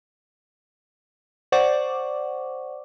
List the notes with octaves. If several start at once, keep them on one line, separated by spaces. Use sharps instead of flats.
C5 D5 F#5 C#6 D6